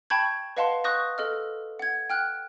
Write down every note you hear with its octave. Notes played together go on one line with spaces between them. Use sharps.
G5 A5 B5 C#6 G6 G#6
B4 D#5 F5 F#5 A5 C6
C#6 D#6 F#6 G6 A#6
A4 D#5 F6
F#5 G#6
G5 F6 F#6